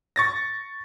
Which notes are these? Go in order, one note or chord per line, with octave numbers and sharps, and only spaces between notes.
C#6 A6 A#6